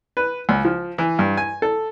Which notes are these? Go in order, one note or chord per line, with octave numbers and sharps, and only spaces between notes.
B4
C#2
F3
E3
G2
G#5
A4